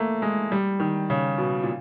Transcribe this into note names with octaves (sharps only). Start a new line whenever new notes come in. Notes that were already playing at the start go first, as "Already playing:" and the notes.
Already playing: A3 A#3
G#3
G3
D#3
C#3
B2
A#2